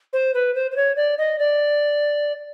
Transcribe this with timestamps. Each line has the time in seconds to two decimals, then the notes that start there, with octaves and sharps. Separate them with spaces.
0.13 C5
0.34 B4
0.54 C5
0.71 C5
0.76 C#5
0.96 D5
1.17 D#5
1.38 D5